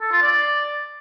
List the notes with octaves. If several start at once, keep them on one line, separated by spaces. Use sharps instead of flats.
A4
F4
D5